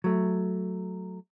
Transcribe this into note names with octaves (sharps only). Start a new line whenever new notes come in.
F#3 A3